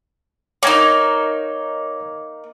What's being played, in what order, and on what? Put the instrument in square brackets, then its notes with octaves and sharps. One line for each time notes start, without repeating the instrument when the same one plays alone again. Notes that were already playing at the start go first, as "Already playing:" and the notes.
[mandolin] A#3 D#4 [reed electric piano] C#5 G#6